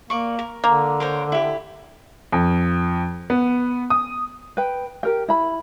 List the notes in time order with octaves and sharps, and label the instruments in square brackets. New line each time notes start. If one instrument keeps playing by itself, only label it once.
[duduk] A#3 [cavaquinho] D5 C#6
[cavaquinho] A#4
[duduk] D3 [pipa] A#3
[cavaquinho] A#4 C5 C#5
E4 G4
[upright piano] F2
B3
D#6
[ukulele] B4 G5
G4 A#4 G5
E4 B5